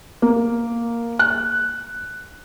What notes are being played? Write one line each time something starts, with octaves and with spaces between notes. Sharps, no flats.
A#3
F#6